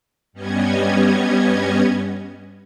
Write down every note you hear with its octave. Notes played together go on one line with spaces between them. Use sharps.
G2 G3 B3 C#4 D#5 G#6